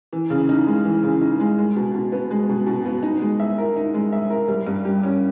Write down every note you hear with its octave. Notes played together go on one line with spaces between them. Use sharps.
E3
C#3
D#4
G#3
E3
C#3
D#4
G#3
G#3
B2
B2
B3
G#3
B2
B2
B3
D#4
G#3
E5
A#4
D#4
G#3
E5
A#4
G3
G2
G4
C#4